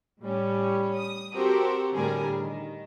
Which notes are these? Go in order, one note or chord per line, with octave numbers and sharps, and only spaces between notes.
A2 G3 C#4
D#6
C4 F#4 G4 A4 A#4 C5
A2 D3 G3 G#4 A#4
D#3